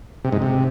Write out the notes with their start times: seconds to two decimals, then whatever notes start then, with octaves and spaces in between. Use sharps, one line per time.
0.25 C3
0.32 G#2
0.42 C3